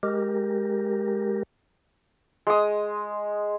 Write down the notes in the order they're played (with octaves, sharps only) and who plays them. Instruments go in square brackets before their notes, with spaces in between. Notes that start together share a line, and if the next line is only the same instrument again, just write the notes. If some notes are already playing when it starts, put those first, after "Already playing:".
[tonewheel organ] G#3 G4 A#4
[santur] G#3 D#6